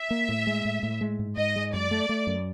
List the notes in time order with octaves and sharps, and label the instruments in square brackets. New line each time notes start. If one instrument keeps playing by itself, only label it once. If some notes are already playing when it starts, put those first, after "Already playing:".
Already playing: [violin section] E5
[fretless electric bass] A#3
A2
G#3
A2
A2
G#3
G#2
[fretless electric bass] G#2 [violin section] D#5
[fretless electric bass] G#3
[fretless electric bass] F#2 [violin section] D5
[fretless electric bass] A3
A3
F#2